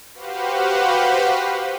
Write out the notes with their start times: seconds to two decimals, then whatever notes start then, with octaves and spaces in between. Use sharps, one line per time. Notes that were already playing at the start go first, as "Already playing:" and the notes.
0.14 F#4 G4 B4 C5 F5 F#5